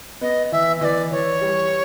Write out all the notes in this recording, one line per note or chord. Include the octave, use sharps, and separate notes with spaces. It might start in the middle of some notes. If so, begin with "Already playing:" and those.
B3 D#5
E3 E5
E3 D5 D#5
E3 C#5
G3